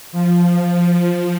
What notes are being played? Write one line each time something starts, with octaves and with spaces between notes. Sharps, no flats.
F3